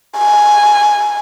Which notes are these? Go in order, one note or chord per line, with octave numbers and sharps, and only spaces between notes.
G#5